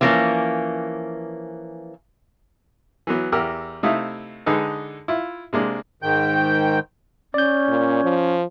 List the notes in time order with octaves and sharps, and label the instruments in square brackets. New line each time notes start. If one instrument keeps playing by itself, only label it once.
[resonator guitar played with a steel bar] E3 F3 A#3 C#4
[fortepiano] E3 F#3 B3
E2 G4 A#4 E6 F6
C3 A3 D#4 E4 F5 D#6
D3 G#3 D#4 G#4 A4 B4
E4 F4
C3 G#3 A#3 D4
[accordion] G#2 D#3 G5 G6
[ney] C#4 [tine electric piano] D5 G6
[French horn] A#2
F3